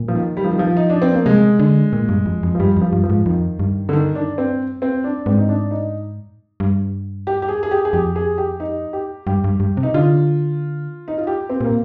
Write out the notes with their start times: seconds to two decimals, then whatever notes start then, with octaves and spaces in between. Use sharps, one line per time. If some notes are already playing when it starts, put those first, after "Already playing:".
Already playing: A#2
0.08 F3
0.15 D#3
0.37 G3
0.44 F3
0.51 D#3
0.59 F3
0.77 D#4
0.90 D4
1.02 C4
1.13 A#3
1.26 C3 G#3
1.59 D3
1.93 A#2
2.09 G2
2.26 F2
2.43 F2
2.55 F3
2.59 G2 G3
2.77 F2 F3
2.93 G2
3.04 F3
3.10 G#2
3.26 F2 D#3
3.60 G2
3.89 D3
3.93 D#3
4.15 D4
4.38 C4
4.82 C4
5.04 D4
5.26 G#2 C4
5.38 D#4
5.49 D4
5.71 D#4
6.60 G2
7.27 G4
7.42 G4
7.48 G#4
7.63 G#4
7.71 G4
7.85 G#4
7.93 F2 G4
8.16 G#4
8.38 G4
8.60 D#4
8.93 G4
9.27 G2 G4
9.44 G2
9.60 G2
9.77 C3
9.83 D#4
9.94 D3 F4
11.08 D#4
11.18 F4
11.27 G4
11.49 C4
11.61 A#2 A#3